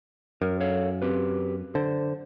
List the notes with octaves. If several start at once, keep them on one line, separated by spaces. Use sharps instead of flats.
F#2 A#4
A4 C#5 F5
C4 G4 B4
D3 C5